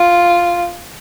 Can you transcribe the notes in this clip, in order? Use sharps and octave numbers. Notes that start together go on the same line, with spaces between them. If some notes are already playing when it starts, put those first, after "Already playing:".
Already playing: F4